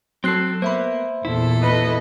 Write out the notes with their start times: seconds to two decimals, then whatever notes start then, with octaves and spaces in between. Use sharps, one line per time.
0.24 F#3 C4 A4 F#6 C7
0.62 A#3 B3 C5 E5 B5
1.25 E2 A#2 E4 A4
1.62 B4 D#5